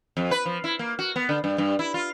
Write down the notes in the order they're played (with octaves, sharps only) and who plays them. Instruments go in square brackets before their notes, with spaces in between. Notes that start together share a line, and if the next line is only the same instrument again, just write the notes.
[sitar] F2
B4
F3
E4
A#3
F#4
B3
D3
G2
G2
E4
F4